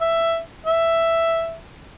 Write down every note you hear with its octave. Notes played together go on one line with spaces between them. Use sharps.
E5
E5